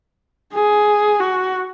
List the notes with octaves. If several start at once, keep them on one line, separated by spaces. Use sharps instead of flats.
G#4
F#4